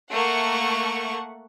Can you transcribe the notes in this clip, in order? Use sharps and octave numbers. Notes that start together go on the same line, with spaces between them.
A3 A#3 F#5 C#6